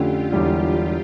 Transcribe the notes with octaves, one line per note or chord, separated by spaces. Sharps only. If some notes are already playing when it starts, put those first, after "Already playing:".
Already playing: F2 D3 A3 C#4 F4 G4
E1 E2 D3 G3